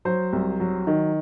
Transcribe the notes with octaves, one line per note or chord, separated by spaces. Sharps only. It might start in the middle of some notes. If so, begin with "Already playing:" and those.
F#3 C5
C2
F#3
D#3